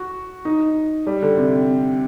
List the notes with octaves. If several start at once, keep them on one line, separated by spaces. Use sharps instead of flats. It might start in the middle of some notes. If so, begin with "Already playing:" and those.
Already playing: F#4
D#4
G3
D3
C3